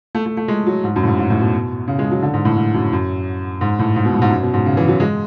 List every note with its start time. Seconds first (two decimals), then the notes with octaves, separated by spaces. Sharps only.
0.15 A3
0.26 A3
0.37 A3
0.48 G#3
0.67 F#3
0.84 G#2
0.96 F#2
1.03 A2
1.07 G#2
1.19 G#2
1.30 A2
1.41 B2
1.88 C#3
1.99 G#3
2.11 F#3
2.22 D3
2.34 G#2
2.45 A2
2.57 G#2
2.74 F#2
2.93 F#2
3.61 G#2
3.79 A2
3.96 G#2
4.05 B2
4.14 A2
4.22 G#2
4.30 F#2
4.43 B2
4.54 G#2
4.66 C#3
4.77 E3
4.88 F#3
5.00 G#3